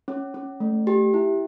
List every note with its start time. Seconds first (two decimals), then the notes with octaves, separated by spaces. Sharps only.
0.08 C#4
0.34 C#4
0.60 A3
0.87 G4
1.14 E4